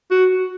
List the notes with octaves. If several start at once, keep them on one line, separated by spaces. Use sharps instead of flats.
F#4